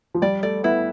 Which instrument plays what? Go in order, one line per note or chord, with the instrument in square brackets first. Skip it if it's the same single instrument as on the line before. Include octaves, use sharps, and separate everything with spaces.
[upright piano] F3
[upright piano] G3 [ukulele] D5
[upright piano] A3 [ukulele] D5
[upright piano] B3 [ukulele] E4